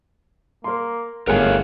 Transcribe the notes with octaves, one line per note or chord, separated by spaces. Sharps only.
A#3 A#4 C6
G1 A3 G#4 A#4 C#5 F5 F#5